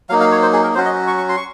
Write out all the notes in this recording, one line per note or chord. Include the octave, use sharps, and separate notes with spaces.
F#3 A#3 D#4 F5
F5
C#5
C5
G#4
A#4
F#3 C#4 F#4 C5
D#5
C#6
C#6
C6
C#6